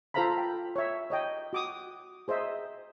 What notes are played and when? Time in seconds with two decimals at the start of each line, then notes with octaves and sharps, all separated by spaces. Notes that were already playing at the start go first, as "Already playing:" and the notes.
0.14 F4 A4 C5 F5 A#5 B5
0.37 G5
0.76 C#5 E5
1.10 C#5 D#5 G5
1.53 F#4 D6 D#6
2.28 G#4 C5 D#5 E5